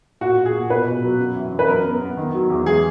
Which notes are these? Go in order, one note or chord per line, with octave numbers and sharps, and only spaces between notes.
A#2 F#4
A#2
G#4
A#2
B2 B4
B2
F#3
F#2
E3
F#2
B4
F#2 A#4
B3
B3
D#3
F#3
E2
G#3 G#4